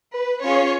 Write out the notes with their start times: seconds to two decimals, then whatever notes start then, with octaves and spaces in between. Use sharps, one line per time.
0.14 B4
0.44 C#4 F4 G#4 C#5